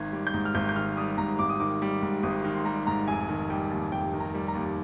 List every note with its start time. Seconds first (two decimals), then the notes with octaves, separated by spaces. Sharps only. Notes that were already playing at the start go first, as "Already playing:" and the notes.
Already playing: G#1 D#3 G#6
0.12 G3
0.27 G6
0.34 G#2
0.45 F6
0.55 G#1 G6
0.69 G6
0.76 D#3 F6
0.97 G3 D#6
1.17 G#2 A#5
1.39 G#1 D6
1.49 D#6
1.60 D#3 D6
1.82 G3
2.02 G#2
2.23 G#1 D#6
2.44 D#3
2.54 C6
2.65 G3 A#5
2.87 G#2 A#5
3.08 F1 G#5
3.29 D#3
3.50 G3 G5
3.71 D#2
3.92 F1 G5
4.13 D#3
4.20 A#5
4.34 G3
4.48 A#5
4.55 D#2